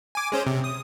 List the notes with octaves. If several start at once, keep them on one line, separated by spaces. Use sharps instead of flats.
G#5 D6
G#3 C#4 C5
C3
D#6